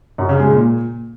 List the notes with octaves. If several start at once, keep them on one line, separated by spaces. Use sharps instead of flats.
F#2
C#3
G#3
A#2